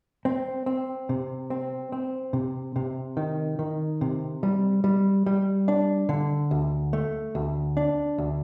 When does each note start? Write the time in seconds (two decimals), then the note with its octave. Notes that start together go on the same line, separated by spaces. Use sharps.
0.25 C4
0.66 C4
1.09 C3
1.50 C4
1.92 C4
2.33 C3
2.76 C3
3.17 D#3
3.59 D#3
4.01 C3
4.43 G3
4.84 G3
5.26 G3
5.68 D4
6.09 D3
6.51 D2
6.93 A3
7.35 D2
7.77 D4
8.18 D2